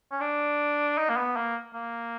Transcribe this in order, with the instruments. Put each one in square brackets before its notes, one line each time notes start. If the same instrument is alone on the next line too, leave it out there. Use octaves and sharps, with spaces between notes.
[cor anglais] C#4
D4
D#4
A#3
B3
A#3
A#3